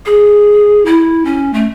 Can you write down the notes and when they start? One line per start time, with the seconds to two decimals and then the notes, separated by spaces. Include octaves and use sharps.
0.06 G#4
0.86 E4
1.25 C#4
1.53 A3